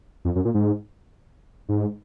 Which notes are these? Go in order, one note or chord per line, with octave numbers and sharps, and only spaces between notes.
F2
F#2
A#2
G#2
G#2